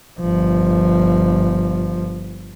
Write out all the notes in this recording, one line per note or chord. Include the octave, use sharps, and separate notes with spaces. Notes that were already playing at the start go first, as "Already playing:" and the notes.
G1 F3